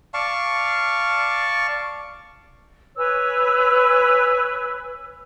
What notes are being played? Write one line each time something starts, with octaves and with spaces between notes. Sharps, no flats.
D5 F5 A5 C#6
B4 C#5 G#5 E6